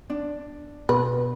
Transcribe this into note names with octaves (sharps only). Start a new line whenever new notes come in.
D4
B2 B4